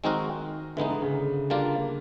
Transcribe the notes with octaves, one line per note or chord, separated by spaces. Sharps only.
D#3 G#3 C4 D#4 F#4 A#4
D3 E3 G#3 B3 D#4
D3
C#3
D3 G3 A#3 D4 F4